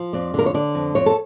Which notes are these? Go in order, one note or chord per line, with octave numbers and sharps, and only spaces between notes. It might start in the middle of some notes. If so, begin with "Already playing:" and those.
Already playing: F3
F2 D5
D3 A#4
C#5
D3 D5
F2
F2 C#5
A4